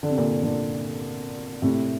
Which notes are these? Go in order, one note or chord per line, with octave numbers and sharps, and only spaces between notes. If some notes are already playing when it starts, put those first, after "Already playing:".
D3
C3
A#2 D3
A#2 D3
A2 C3